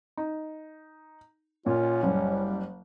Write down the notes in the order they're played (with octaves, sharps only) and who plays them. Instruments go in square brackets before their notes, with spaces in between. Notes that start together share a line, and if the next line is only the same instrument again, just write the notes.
[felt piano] D#4
[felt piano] A#2 [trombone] C#4 [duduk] F4
[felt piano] F#1 [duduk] G3